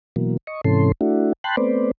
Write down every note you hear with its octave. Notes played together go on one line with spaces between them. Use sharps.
B2 E3 F#3 A#3
D#5 C#6
G#2 C3 E3 C#4 A4 C6
A3 D4 E4 F#4
G5 A5 B5 C6 F#6
A3 B3 C4 B4 C5 D5